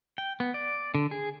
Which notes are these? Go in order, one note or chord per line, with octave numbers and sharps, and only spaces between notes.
G5
B3
D5
D3
G#4